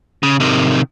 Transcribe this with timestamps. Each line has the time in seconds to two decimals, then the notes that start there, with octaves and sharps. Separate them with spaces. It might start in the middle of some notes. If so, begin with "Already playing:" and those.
0.23 C#3
0.40 C3 D#3